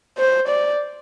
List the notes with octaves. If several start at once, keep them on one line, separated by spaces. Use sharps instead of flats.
C5
D5